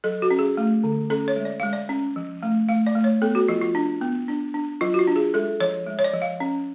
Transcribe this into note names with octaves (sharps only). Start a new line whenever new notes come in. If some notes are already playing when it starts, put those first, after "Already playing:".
F#3 A4
F#4
C#4
G#4
A3
D3
C#4 A4
C#5
G#3
D5
G#3 F5
D5
C#4
F3
A3
A3 F5
D5
A3
C#5
B3 A4
F#4
F3 F4
F4
D4
B3
D4
D4
F#3 F4
F#4
F4
D4
G#4
G#3 A4
F3 C#5
G#3
C#5
D5
F3
F5
C#4